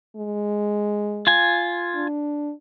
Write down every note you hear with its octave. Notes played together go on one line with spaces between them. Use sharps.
G#3
F4 G#5
D4